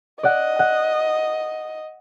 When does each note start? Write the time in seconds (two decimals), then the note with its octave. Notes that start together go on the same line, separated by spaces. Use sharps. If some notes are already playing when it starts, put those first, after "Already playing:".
0.23 D5 D#5 F#5
0.59 F#5